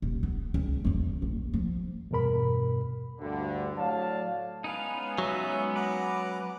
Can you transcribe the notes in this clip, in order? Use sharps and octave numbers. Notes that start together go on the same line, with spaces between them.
D#1
B3
C#2
E2 C#3
A#1
F3
E2 G2 B2 A#4 B5
D2 G2 D3
A2 F#3 D5 F5 A5
G#3 B3 C#4 D#4 B4 F5 G#5
F#3 E5
B4 F#5 A#5 D6